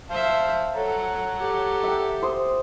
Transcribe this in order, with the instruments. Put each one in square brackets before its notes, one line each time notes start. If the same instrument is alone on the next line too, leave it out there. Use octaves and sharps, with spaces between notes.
[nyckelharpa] C5 E5 [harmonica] F5 A5
[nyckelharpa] A4 [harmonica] C#5 F#5 A#5
[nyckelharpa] G4 A4
[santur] E5 G5
C5 C6 D#6